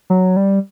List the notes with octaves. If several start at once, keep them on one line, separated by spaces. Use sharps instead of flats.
F#3
G3